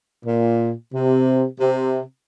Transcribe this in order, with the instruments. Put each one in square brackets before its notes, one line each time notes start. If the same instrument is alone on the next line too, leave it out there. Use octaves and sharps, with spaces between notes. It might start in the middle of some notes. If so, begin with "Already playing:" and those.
[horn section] A#2
C3
C3